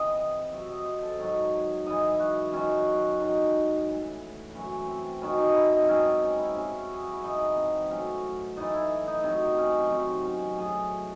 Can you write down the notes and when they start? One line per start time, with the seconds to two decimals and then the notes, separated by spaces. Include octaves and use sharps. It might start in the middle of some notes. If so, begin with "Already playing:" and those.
Already playing: C3 E3 D#5
0.52 C3 F#3 E5
0.69 D#5
0.85 C5
1.03 A4
1.19 G#2 D#3 F#3 C#5
1.86 G#2 E3 D#5
2.19 F#4
2.53 F#2 D#3 F#3 C#4
3.20 G#2 D#3 F#3
3.87 A2 E3
4.55 F#2 E3 C#4
4.88 C4
5.22 F#2 D#3 F#3 C#4
5.38 D#4
5.55 E4
5.72 D#4
5.83 C4
5.89 G#2 F#3 C#4
6.06 C4
6.22 C#4
6.39 E4
6.55 C3 F#3 C#4
6.94 G#4
7.03 F#4
7.13 E4
7.23 G#2 E3 D#4
7.57 C4
7.90 A2 F#3 C#4
8.57 A2 E3 D#4
8.73 E4
9.07 D#4
9.24 C3 F#3 D#4
9.58 C#4
9.91 C3 D#3 F#3 C4
10.25 C#4
10.58 A2 F#3 G#4